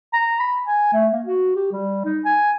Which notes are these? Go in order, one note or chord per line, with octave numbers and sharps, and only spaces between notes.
A#5
B5
G#5
A3
A#3
F#4
G4
G3
D#4
G#5